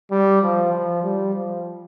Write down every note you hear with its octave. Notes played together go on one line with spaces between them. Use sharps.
G3
F3
F3
G3
F3